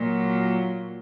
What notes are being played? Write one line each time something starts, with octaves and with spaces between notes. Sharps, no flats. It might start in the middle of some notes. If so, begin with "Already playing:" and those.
Already playing: A#2 F#3